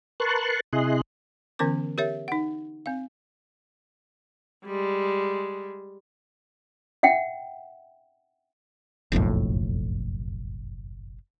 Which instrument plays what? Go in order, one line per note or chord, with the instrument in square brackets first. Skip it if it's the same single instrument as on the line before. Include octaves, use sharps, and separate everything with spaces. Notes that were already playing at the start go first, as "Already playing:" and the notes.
[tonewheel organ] A#4 B4 A5 C6 C#6 F#6
C3 E4 G#4 D#5 C6 F#6
[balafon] D3 E3 B3 C#4 A#4 D6
G4 A#4 C#5 E5
D#4 F#5
C4 F5
[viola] G3 G#3
[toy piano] E5 F#5 G5
[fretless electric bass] F#1 B1 F2 A2